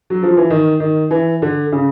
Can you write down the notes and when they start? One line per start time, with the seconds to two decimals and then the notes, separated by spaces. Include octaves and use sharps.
0.10 F#3
0.23 F3
0.37 E3
0.50 D#3
0.80 D#3
1.11 E3
1.42 D3
1.72 C#3